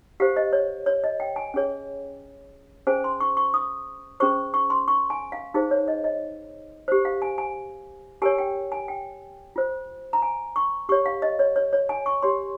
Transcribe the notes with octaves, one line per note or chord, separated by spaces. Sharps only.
G4 C5 F5
D#5
C#5
C#5
D#5
G5
G#5
C#4 G#4 C#5
C#4 G#4 C5 G#5
C6
C#6
C#6
D#6
C#4 G#4 C5 C#6
C#6
C6
C#6
G#5
F5
D#4 G#4 C5 F5
C#5
D#5
D#5
G4 C5
F5
G#5
G#5
G4 A#4 C#5 G#5
G5
G#5
G5
F4 C5
A#5
G#5
C#6
G4 C#5 C#6
F5
D#5
C#5
C#5
C#5
G#5
C#6
G4 C#5 C6